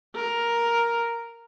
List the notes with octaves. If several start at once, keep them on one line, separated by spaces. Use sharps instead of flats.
A#4